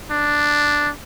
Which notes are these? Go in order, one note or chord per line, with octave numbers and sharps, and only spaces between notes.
D4